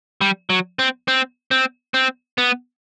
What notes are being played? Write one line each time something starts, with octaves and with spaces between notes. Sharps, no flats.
G3
F#3
C4
C4
C4
C4
B3